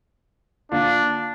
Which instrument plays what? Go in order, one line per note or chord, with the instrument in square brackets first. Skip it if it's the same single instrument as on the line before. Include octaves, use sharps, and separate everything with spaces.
[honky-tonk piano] D3 A#3 F4 [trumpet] D4